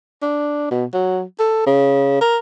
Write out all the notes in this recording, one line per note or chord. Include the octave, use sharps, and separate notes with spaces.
D4
B2
F#3
A4
C#3
A#4